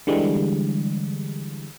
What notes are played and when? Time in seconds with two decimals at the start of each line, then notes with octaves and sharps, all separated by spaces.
0.07 D3 E3 G3 G#3